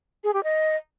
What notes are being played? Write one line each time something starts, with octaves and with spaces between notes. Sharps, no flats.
G#4
G4
D#5